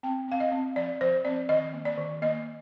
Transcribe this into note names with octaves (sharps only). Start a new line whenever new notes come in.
C4 G5
C4 F5
D#5
C4
F3 D5
F3 C5
C4 D5
D#3 D#5
A#3
D5
D#3
A#3 D#5